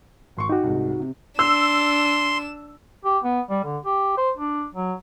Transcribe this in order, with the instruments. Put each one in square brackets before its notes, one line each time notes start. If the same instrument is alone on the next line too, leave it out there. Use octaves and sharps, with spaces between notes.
[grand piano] G#1 C6 C#6
[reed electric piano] D#4 F#4 [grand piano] G5 D6
[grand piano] C2 G#2
C3
[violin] D4 E7 [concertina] C6 [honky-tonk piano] E6
[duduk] G4
B3
G3
D3
G4
C5
D4
F#3